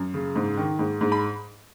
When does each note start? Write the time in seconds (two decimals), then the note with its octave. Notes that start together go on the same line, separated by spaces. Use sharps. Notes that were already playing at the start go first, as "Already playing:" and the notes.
Already playing: F#2
0.14 C#3
0.36 G#2
0.57 D#3
0.79 G#2
1.01 G#2
1.12 B5